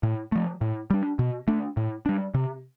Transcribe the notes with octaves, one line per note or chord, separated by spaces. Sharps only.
A2
F3 A3
A2
G3 D4
B2
A3 D4
A2
G3 D4
C3